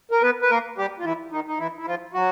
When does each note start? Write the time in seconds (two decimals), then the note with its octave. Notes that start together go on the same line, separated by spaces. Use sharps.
0.11 A#4
0.22 B3 B4
0.42 B4
0.50 A#3 A#4
0.78 G3 G4
0.99 F4
1.04 E3 E4
1.32 D#3 D#4
1.47 D#4
1.59 E3 E4
1.79 E4
1.87 F3 F4
2.14 F#3 F#4